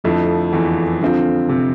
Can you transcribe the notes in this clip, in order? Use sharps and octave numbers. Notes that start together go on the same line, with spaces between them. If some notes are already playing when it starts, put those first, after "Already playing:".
F2 D3 F3 A3 E4
E2 E3
D3 F3 C4 F4
C3